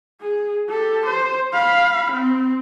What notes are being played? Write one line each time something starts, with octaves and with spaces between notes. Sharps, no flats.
G#4
G4 A4
C5
F5 B5
C4